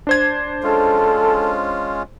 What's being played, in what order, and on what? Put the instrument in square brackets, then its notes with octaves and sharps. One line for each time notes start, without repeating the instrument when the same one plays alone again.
[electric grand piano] D4 C5 G#6
[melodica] G#3 C#4 F4 [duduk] A4